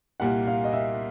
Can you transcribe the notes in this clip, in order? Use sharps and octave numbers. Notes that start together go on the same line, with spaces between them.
C2 A#2 G3 A#3 F#5
F5
D#5
E5